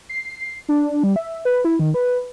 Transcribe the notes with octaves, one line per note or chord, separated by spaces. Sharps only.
C7
D4
G3
E5
B4
E4
D#3
B4